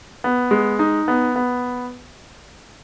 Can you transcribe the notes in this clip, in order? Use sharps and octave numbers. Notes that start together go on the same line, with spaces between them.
B3
G#3
D#4
B3
B3